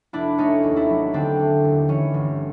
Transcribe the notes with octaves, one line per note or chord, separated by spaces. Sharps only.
F1 D4 E4
A3 C#4 D#4
D#2
D4 E4
F#3
D3 C4 D4
A3
D#2
E3 C#4
G1